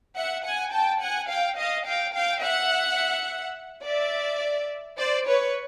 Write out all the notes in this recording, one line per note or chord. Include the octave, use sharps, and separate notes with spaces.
E5 F#5
F#5 G#5
G5 A5
F#5 G#5
F5 G5
D#5 F5
F5 G5
F5 G5
E5 F#5
D5 E5
C5 D5
B4 C#5